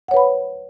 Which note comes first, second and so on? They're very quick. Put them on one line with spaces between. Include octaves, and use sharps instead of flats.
F#5 C#5 B4 B5